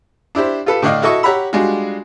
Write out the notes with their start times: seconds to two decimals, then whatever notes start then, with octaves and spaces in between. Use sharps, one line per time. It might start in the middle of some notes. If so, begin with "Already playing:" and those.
0.35 D4 E4 G4 C5
0.66 F4 G4 A4 B4
0.82 A2 D3 D4 D#5 F5 F6
1.02 E4 F#4 A4 D#5 C#6
1.23 G4 C#5 F#5 A#5 B5 E6
1.53 G3 G#3 D4 F4 F#4